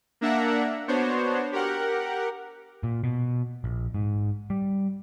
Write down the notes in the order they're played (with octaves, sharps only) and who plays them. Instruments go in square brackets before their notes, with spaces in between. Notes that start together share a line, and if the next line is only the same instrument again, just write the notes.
[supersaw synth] A#3 D4 E5 F#5 A#5
B3 D4 F#4 C5 C#5
G4 A#4 F#5
[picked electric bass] A#2
B2
A#1
G#2
G3